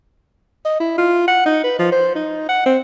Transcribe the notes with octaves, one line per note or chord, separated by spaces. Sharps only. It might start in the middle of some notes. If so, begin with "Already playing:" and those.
D#5
E4
F4
F#5
D#4
B4
F3
C5
D#4
F#5
C4